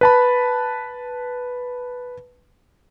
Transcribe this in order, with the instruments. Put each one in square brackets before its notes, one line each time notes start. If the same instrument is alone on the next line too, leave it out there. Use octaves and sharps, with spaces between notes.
[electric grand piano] B4 A5 B5